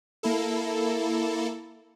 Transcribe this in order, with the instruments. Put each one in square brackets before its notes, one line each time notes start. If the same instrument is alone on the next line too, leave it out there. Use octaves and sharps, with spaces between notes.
[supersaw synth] A#3 E4 A4